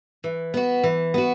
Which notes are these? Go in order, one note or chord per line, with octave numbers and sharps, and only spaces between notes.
E3
B3 F#4
E3
B3 F#4